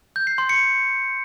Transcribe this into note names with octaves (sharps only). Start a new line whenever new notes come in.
G6
C7
C6
C#7